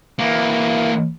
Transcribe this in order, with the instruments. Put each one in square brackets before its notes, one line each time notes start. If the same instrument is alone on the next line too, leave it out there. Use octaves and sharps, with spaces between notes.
[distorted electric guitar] E3 A#3